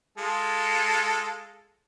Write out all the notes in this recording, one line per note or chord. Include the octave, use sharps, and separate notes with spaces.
G#3 F4 A4